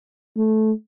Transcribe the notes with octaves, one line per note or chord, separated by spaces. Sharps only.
A3